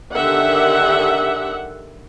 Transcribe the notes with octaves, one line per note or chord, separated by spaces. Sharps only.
D3 D#3 G4 E5 F#5